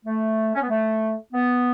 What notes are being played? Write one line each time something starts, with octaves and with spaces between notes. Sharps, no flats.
A3
C#4
B3
A3
B3